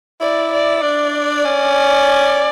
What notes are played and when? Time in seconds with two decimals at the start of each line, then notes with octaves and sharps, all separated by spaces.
0.21 E4 D5
0.52 D5
0.82 D4 D5
1.45 C#4